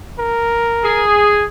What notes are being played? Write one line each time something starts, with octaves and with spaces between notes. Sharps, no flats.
A#4
G#4